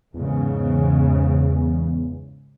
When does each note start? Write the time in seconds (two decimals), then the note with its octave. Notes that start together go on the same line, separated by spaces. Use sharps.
0.14 E2 G#2 C#3